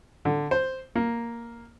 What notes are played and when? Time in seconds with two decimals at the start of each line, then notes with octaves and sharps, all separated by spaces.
0.25 D3
0.51 C5
0.95 A#3